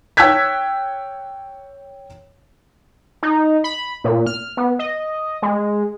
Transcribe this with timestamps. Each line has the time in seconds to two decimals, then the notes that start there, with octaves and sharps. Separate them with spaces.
0.17 C#5 G5 E6 F#6 G#6 B6
3.23 D#4
3.64 B5
4.04 A#2
4.27 F6
4.57 B3
4.79 D#5
5.42 G#3